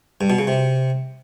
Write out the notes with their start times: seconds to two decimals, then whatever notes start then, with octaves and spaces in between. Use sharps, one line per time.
0.21 G2
0.30 B2
0.39 C#3
0.48 C3